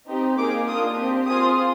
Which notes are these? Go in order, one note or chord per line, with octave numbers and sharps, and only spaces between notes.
C4 D#4 G4
A#3 D#4 G#4 D6
A#3 D4 F4 D#6
C4 G4
C4 F4 G#4 D#6